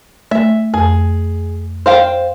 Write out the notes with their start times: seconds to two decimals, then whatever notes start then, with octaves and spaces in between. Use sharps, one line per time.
0.31 A3 E5
0.74 F2 G#4
1.86 C5 F5 G5